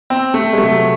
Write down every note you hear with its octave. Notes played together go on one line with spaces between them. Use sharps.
C4
A3
G#3
C3 F#3 A3